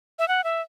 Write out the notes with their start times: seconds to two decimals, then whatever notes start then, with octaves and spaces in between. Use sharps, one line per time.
0.19 E5
0.28 F#5
0.44 E5